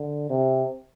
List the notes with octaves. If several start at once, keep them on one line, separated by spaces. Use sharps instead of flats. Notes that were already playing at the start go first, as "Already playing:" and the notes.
Already playing: D3
C3